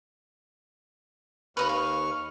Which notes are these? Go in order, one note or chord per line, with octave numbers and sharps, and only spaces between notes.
D#2 B4 D#5 B5 C#6 F6
F5